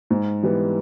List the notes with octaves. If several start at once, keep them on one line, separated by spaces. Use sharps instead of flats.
G#2
E3 G3 B3